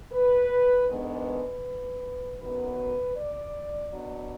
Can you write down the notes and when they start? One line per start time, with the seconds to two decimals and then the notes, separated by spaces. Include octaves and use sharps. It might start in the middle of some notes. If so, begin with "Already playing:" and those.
0.12 B4
0.87 F2 D#3 G#3 B3 D4 B4
2.39 F#2 D#3 F#3 B3 B4
3.16 D5
3.91 B2 F#3 D4